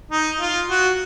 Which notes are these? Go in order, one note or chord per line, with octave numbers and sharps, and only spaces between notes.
D#4
F4
F#4